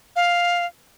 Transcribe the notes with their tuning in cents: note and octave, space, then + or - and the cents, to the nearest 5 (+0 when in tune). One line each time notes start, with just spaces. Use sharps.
F5 +5